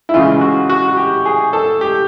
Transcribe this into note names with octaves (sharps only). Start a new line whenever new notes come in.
E4
C#2 C#3 E3 F4
F#4
F#4
F#4
G4
G#4
A4
G4